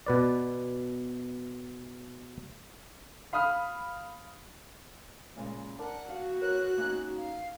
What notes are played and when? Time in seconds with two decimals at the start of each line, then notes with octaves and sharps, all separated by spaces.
0.06 B2 B4 D5
3.33 F5 B5 D#6 F6
5.36 A#2 C#3 G#3
5.79 D4 A#4 F#5 A5
6.09 F#4 F5
6.41 A#4 B4 C#5 F#6
6.78 A#3 C#4 D#4
7.16 F5